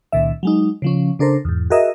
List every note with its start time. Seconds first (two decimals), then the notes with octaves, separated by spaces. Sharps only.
0.12 C#2 A#2 D#3 E5
0.43 F#3 G#3 D#4
0.82 C#3 F3 C#4
1.19 C#3 D4 A4 A#4 C5
1.45 E2 G#2
1.70 F#4 G#4 A#4 D#5 E5